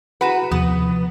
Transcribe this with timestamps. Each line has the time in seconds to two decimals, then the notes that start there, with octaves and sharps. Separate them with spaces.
0.21 E4 F#4 G#4 B4 F#5 A#5 B6 E7
0.51 D#2 C3 F3 B3 D#6 D#7